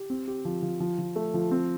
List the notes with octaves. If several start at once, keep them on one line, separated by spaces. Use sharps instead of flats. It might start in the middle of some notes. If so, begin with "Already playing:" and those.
Already playing: G4
C4
G4
F3
F3
F3
F3
A3
F3
C4